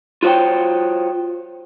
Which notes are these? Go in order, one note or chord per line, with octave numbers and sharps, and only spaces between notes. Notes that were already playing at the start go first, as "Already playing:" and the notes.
F4 F#4 C5 C#5 G5